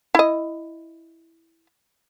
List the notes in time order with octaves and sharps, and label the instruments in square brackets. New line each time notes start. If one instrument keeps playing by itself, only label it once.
[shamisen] E4 D#5